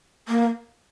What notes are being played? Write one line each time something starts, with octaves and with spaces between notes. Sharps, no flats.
A#3